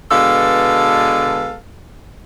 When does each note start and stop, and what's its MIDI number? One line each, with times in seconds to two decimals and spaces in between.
0.11 1.56 47
0.11 1.56 50
0.11 1.56 56
0.11 1.56 69
0.11 1.56 71
0.11 1.56 77